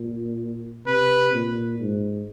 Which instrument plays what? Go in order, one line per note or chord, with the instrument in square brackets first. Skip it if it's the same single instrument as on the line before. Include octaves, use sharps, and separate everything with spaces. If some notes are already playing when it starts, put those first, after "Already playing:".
Already playing: [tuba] A#2
[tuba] C3 [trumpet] B4
[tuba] A#2
G#2